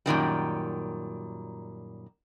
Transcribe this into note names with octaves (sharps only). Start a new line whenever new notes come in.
F#2 A#2 D#3 G3